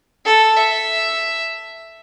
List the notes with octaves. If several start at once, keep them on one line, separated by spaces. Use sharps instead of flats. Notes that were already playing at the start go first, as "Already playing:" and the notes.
A4
E5